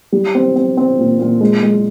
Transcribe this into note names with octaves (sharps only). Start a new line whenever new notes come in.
G3
C4
C4
C4
A#2
A#2
G#3
G#3